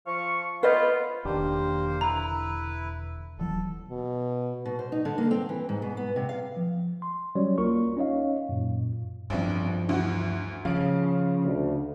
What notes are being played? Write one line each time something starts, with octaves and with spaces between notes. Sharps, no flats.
F3 F5 C#6
B3 F4 B4 C5 D#5
E1 D#3 A#3 D4 G4 C5
D3 E4 B4 A#5
D#1 E3 F#3 A4
B2
B2
C5
D#4
D3
A#3
C4
E3
G#2
B2
B3
C3
F5
F3
C6
F#3 G3 C#4 F#4 C#5 D5
C#2 A#3 F4 A#4 C#6
C#4 D#4 C#5 D#5 F5
F#2 A#2
A1 G2 F3 C4 D4
D2 E3 F#4
C#3 F3 F5 D7
D2